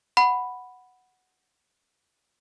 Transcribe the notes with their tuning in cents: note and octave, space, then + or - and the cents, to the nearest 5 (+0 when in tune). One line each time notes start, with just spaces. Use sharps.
F#5 +0 B5 +0